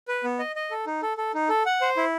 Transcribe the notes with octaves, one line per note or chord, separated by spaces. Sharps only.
B4
B3
D#5
D#5
A4
D#4
A4
A4
D#4
A4
F#5
C5
E4